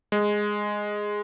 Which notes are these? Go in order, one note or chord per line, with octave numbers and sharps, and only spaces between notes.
G#3